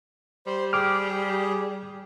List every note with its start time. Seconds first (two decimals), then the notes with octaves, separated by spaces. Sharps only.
0.47 G3 C5
0.73 G4 G#4 D6 F6